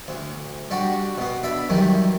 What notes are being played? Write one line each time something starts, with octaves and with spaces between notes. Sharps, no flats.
D2
G3 D4 F#4
B2 B3
D4 E5 B5
F#2 D#3 E3 G3